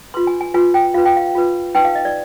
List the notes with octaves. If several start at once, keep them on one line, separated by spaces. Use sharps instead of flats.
F4 B4 C6
G#5
G#5
F4 B4 G#5
G5
F4 B4 F5
G5
F5
F4 B4
D#4 B4 G5
F5
D#5
D5